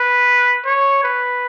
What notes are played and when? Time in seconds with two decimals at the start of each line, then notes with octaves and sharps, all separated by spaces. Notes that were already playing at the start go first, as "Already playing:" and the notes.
Already playing: B4
0.65 C#5
1.04 B4